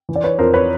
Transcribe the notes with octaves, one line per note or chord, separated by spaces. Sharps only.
E3
D5
B4 C#5
F2 A#4 C5
B4 C#5